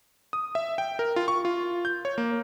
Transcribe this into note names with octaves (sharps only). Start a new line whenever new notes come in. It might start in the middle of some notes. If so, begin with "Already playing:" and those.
D#6
E5
G5
A#4
F4
C#6
F4
G6
C#5
A#3